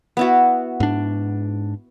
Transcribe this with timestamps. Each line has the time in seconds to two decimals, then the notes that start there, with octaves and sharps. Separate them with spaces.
0.17 B3 E4 F#4
0.80 G#2 D4